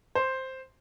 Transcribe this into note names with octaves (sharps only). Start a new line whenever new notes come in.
C5